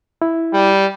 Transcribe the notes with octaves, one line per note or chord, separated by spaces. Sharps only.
E4
G3